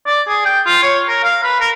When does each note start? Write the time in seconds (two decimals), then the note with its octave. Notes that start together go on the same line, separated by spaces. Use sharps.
0.07 D5
0.28 G#4
0.45 G5
0.66 F4
0.83 C#5
1.08 A#4
1.24 F5
1.43 B4
1.60 A#4